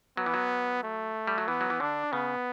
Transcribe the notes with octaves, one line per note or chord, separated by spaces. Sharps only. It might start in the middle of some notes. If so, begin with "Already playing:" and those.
F#3 B3
E3
F#3
A3
G3
F#3
E3 B3
F#3
E3
D3 D4
C#3 B3